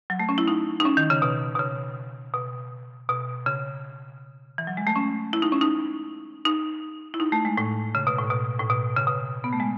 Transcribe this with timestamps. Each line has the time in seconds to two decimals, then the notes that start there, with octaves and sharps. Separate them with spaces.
0.10 F#3
0.19 A3
0.29 C#4
0.38 E4
0.48 D#4
0.80 D#4
0.85 C#4
0.97 D#3
1.10 C#3
1.22 B2
1.55 B2
1.59 C#3
2.34 B2
3.09 B2
3.46 C#3
4.58 E3
4.67 F#3
4.77 G#3
4.87 A3
4.96 C#4
5.33 E4
5.42 D#4
5.52 C#4
5.61 D#4
6.45 D#4
7.14 E4
7.20 D#4
7.32 A3
7.45 G#3
7.57 A2
7.95 C#3
8.07 B2
8.18 A2
8.31 B2
8.60 A2
8.70 B2
8.97 C#3
9.07 B2
9.44 B3
9.53 A3
9.60 G#3